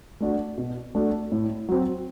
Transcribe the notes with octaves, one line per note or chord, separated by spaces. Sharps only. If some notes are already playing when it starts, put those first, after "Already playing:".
A3 D4 F#4
B2
A3 D4 F#4
A2
F#3 C4